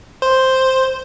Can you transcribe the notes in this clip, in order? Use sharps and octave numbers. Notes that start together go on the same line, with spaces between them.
C5